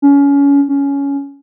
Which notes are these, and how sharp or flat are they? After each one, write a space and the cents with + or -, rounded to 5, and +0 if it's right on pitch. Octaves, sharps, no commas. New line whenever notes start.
C#4 +25
C#4 +15